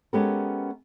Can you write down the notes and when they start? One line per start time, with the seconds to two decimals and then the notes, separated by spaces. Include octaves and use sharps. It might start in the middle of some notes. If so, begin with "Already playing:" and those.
0.13 G#3 B3 C#4 G4 A4 A#4